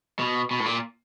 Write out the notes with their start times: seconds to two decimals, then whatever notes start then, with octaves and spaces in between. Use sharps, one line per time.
0.19 B2
0.51 B2
0.60 A2
0.66 A#2